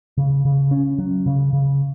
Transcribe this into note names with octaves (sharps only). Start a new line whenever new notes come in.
C#3
C#3
C#4
F#3
C#3
C#3